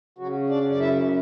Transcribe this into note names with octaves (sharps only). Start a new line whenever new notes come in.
C#3 F#3 F#4
D4 D5
F#2
D5
E4 E5